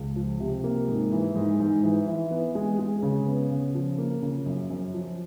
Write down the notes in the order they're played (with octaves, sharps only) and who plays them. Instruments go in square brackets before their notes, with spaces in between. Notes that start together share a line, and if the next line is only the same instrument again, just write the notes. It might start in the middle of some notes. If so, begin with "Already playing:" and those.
Already playing: [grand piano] C#2
F3
C3
A#3
G#2
E3
G#2
G#2
E3
E3
B3
G#3
G#3
C#3
B3
C#3
F3
A#3
C#3
F#2
F#2
F3